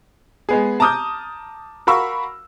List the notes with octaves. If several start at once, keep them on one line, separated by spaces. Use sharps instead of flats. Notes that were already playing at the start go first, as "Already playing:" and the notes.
G#3 B3 G#4
A5 A#5 D6 D#6 F6 G6
F#4 A#4 F5 B5 C#6 E6